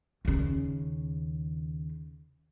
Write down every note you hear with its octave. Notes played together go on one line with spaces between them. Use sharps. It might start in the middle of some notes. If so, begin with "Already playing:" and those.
D#2 C#3